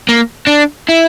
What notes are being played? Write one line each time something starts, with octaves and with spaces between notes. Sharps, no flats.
A#3
D4
E4